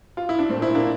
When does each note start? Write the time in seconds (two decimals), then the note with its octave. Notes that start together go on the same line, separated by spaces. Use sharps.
0.17 F4
0.29 E4
0.39 D4
0.49 A3 C4
0.55 A#2
0.62 C4 E4
0.75 A#3 D4